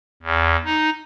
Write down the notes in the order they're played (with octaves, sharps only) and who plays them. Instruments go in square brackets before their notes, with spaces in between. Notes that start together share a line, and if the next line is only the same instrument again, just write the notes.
[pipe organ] E2
D#4